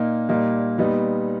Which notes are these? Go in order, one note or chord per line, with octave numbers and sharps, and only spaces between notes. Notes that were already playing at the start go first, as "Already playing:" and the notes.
Already playing: A#2 A#3 D#4
A#2 G3 A#3 D#4
A#2 G3 B3 D#4